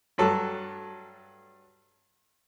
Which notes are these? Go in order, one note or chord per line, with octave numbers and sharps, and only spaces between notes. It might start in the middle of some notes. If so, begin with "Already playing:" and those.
G2 F#3 A4